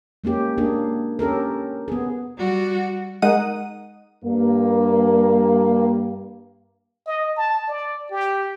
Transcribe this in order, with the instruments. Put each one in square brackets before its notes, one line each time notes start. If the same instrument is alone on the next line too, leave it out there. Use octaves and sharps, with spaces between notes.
[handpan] G#3 A#3 C#4 G4
A#3 D4 G#4
C#4 G4 A4 A#4
B3 G#4
[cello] G3 F#4
[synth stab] G#3 D#4 A#4 F#5 D#6 D#7
[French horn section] G2 A#3
[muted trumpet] D#5
A5
D5
G4